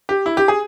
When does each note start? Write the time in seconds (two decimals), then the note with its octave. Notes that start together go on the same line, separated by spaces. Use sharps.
0.09 G4
0.26 E4
0.37 G4
0.48 G#4